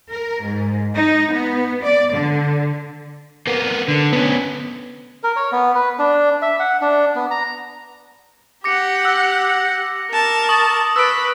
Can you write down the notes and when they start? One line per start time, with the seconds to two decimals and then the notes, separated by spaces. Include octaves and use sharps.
0.11 A#4
0.43 G#2
0.96 D#4
1.32 B3
1.83 D5
2.14 D3
3.47 A#3 B3
3.89 D3
4.13 B3 C#4
5.23 A#4
5.36 C#5
5.52 B3
5.75 B4
5.99 D4
6.42 E5
6.60 F#5
6.81 D4
7.15 B3
7.31 A#5
8.64 G4 F#5 D6 A#6 C#7
9.05 E6 A#6
10.10 A#4 A5
10.49 C#6 D#6 F#7
10.96 B4 E6 D7